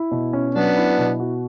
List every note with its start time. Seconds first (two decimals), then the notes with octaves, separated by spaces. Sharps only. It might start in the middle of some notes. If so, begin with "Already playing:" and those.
Already playing: E4
0.11 B2
0.33 C#4
0.55 F#3 B3 D4
0.77 E4
0.98 B2
1.20 F#4